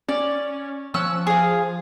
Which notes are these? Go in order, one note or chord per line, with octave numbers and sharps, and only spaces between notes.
C#4 D5
F3 C#4 E6 F#6
G#4 F5